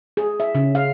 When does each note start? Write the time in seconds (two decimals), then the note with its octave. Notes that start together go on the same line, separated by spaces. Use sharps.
0.17 G#4
0.40 E5
0.55 C#3
0.75 F5